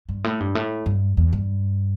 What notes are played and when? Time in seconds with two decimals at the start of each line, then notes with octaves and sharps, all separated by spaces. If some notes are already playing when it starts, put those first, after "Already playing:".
0.09 G2
0.24 A2
0.40 G2
0.55 A2
0.86 G2
1.17 E2
1.33 G2